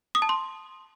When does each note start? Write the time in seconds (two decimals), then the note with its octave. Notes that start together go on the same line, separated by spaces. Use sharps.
0.15 D#6
0.22 A5
0.29 C6